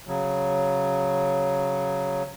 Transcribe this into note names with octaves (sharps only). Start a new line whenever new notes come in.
C#3 F#3